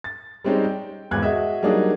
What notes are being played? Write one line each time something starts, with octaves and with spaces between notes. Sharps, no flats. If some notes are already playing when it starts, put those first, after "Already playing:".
A6
G3 G#3 C4 C#4 D#4
G5
G#1 E2 F#6 G#6
F#4 G#4 D#5 E5
F#3 G3 A#3 D4 D#4 G#4